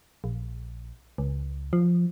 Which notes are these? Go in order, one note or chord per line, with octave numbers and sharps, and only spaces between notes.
A#1
C#2
F3